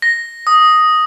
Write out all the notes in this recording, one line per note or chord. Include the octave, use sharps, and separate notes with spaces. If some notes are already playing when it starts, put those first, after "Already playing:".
A#6
D#6